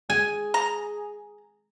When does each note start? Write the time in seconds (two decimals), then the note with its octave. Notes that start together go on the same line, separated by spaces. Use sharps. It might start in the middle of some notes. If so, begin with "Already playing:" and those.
0.10 G#4 G#5
0.54 A#5